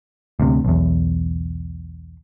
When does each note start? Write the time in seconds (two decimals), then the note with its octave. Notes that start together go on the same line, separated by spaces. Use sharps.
0.40 D2 C3
0.65 B1 E2